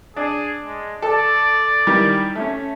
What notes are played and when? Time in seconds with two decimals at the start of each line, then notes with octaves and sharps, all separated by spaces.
0.16 D4 G#4
0.64 G#3
1.02 A4 D5
1.87 D#3 E3 G3
2.35 A3 C#4